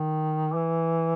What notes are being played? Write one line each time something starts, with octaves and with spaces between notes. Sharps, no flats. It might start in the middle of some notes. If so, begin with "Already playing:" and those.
Already playing: D#3
E3